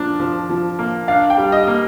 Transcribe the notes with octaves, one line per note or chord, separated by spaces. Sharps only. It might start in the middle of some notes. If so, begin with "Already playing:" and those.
Already playing: F3 A#3 D4
F3
F3
A#3
D4 F5
G5
G3
D#5
A#3